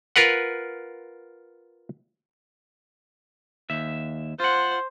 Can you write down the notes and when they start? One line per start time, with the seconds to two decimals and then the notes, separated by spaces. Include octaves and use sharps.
0.16 F4 A#4 B4 F#5
3.70 D#2 E5
4.40 F4 C5 F#5